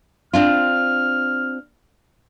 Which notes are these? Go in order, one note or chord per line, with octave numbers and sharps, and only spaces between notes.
C4 D4 F4 F6